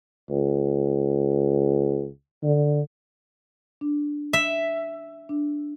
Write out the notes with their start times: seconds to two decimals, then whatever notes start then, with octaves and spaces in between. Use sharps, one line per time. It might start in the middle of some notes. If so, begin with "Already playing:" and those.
0.30 C#2
2.43 D3
3.81 D4
4.33 E5
5.29 D4